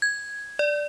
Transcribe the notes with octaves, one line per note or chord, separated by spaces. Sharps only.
G#6
D5